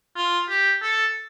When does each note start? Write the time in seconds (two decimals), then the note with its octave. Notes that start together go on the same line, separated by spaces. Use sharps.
0.16 F4
0.49 G4
0.82 A4